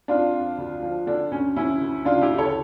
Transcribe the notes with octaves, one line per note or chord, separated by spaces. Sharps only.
F2 D4 F4
F2
D2
F3
D3 D4
D2 C#4
D2 C#4 E4
D2
C#3 D4 F4
E4 G4
D2
A4 C#5